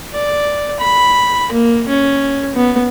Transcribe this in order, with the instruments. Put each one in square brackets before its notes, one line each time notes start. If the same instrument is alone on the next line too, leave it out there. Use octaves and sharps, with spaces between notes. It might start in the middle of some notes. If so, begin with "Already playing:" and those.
[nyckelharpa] D5
B5
A#3
C#4
B3